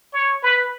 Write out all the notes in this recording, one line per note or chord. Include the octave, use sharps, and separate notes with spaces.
C#5
B4